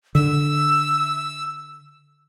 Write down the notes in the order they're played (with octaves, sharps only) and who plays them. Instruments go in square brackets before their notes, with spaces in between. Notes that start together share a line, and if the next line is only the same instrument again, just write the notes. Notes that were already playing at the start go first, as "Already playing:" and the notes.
[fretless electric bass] D3 [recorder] E6